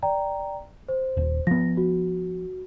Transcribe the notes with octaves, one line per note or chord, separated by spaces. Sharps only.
D5 G5 A#5
C5
D#1
F3 B3 A#6
F#4